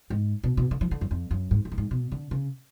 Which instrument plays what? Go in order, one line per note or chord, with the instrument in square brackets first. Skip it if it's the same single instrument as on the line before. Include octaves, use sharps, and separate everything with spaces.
[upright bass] G#2
B2
B2
D3
F3
D3
F#2
F2
F#2
G#2
G#2
A2
G#2
B2
D3
C#3